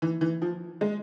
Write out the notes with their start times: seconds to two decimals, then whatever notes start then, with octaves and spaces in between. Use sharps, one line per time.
0.02 E3
0.21 E3
0.42 F3
0.81 G#3